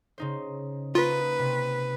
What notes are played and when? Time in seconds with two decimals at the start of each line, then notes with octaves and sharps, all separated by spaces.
0.18 C#3 D#4 C5
0.95 A#3 D#4 F4 F#4 B4
1.39 C3